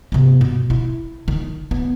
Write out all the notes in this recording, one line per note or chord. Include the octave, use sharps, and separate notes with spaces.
C3 B3
B2
E4
D#3
B3